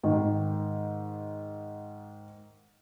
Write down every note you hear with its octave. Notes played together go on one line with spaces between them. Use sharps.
G#2 D#3